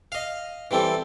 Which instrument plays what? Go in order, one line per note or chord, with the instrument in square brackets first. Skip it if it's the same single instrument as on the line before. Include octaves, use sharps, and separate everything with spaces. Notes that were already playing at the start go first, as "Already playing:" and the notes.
[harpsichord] D#5 F5
E3 G3 C4 A4